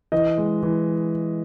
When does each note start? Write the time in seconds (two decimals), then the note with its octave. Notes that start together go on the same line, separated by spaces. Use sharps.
0.12 E3 D#5
0.38 G#3
0.63 E3